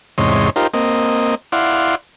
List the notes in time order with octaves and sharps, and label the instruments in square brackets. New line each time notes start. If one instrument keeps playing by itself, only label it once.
[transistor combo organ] E2 G#2 C3 C#5 D#5 C6
D#4 F4 G4 A#4 C5
A#3 C4 D#5
E4 D5 F5 F#5 C6